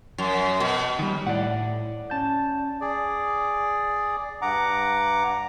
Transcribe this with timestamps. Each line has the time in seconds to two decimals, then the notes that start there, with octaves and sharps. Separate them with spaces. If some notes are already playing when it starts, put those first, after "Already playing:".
0.18 F#2
0.60 B2
0.99 D#3 G3
1.27 A2 D5 F#5
2.10 C#4 A5 G6
2.80 G#4 D5
4.42 G2 F#5 A#5 D6